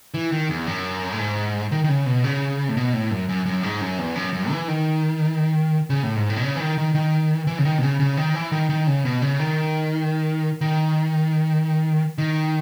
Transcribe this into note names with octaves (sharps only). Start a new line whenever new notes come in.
E3
D#3
E2
F#2
A2
G#2
D#3
D#3
C#3
B2
C#3
A2
B2
A2
F#2
F#2
F#2
G#2
F#2
E2
F#2
F#2
E3
D#3
C#3
A2
G#2
A2
B2
C#3
E3
D#3
D#3
D#3
E3
C#3
D#3
B2
C#3
C#3
D#3
E3
D#3
D#3
C#3
B2
C#3
D#3
D#3
D#3